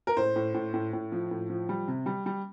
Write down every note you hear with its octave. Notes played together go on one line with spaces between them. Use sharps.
A#4
A2 C5
A2
A2
A2
A2
F3
A2
F3
G3
C3
G3
G3